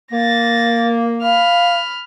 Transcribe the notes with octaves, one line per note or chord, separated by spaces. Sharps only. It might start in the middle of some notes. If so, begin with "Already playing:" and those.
A#3 A6 A#6
F5 B5 F6